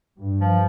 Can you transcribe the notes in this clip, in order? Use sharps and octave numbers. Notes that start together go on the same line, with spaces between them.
G2
F3